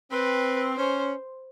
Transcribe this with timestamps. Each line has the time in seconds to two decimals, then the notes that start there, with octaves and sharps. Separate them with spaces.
0.11 C4 B4
0.77 C#4 C5